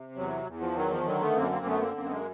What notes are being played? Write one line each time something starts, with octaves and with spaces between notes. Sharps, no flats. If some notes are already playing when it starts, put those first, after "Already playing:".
Already playing: C3
E2 F#3
E2
F3
D#3 F#3
F3
D3 F#3
A3 B3
F#2 A#3 C4
A#3 C4
D3 A3 B3
A#3 C4
F#2 A#3 C4
B3
G#3 A#3